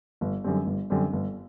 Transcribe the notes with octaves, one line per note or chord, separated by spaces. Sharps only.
G1
F#2 D3 G3 C4
G1
F#2 D3 G3 C4
G1